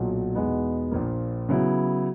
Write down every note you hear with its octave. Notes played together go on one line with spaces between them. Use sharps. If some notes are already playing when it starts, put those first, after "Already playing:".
Already playing: B1 A#2 F#3
E2 B2 G#3 B3 D#4
A#1 A#2 F3 A#3
C#3 F#3 B3 E4